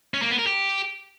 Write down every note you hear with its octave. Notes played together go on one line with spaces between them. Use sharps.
C#4
A#3
B3
A#4
G4